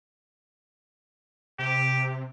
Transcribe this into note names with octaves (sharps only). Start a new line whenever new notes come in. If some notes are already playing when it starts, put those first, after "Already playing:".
C3 G4